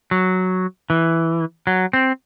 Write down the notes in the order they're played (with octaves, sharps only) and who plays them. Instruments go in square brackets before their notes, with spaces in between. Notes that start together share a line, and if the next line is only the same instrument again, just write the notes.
[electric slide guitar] F#3
E3
F#3
C4